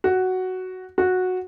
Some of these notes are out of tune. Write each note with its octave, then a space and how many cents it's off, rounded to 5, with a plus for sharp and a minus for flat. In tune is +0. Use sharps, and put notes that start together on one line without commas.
F#4 +5
F#4 -10